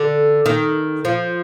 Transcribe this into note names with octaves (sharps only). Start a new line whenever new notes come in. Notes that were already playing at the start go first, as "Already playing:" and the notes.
Already playing: D3
D#3
F3